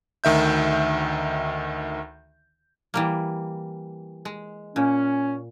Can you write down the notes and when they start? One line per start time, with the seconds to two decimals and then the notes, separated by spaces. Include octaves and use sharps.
0.24 D2 D#3 E5 G6
2.94 E3 G3 A#3
4.25 G#3
4.76 A#2 C#4